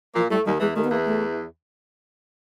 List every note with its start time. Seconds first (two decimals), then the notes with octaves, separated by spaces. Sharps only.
0.15 A#2 F3 A#3
0.30 A2 G3 A3
0.46 D#2 D#3 G3
0.60 E2 E3 G#3
0.76 D#2 D#3 A3
0.84 B3
0.91 E2 E3 A#3
1.06 A3